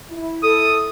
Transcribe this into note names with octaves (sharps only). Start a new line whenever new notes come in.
E4
A4 D#6